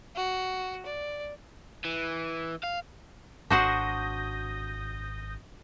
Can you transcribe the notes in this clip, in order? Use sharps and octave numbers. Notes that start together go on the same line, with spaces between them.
F#4
D5
E3
F5
G#1 D4 F#4 C5 D#6 G6 A#6